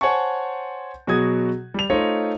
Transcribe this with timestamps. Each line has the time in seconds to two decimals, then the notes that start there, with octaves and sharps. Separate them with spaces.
0.01 C5 C#5 F#5 G#5 A5 C#6
1.07 B2 F#3 F#4 G#4 D#6 G#6
1.74 G3 F7
1.90 A3 D#4 F4 C5 C#5 D#5